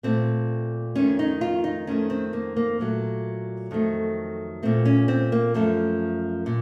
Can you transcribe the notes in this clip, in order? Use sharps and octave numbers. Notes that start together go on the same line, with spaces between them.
A#2 A3 C4
F2 D#3 A3 C#4
D#4
F4
D#4
F2 D#3 A3 C#4
C4
A#3
A#3
A#2 F#3 A3
F2 D#3 F#3 A3
A#2 A3 C4
C#4
C4
A#3
F#2 F3 A3
A#2